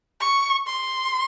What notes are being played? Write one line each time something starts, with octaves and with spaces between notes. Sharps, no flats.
C#6
C6